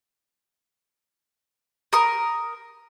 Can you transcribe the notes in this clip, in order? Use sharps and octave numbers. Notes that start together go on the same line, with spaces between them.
A#4 D#6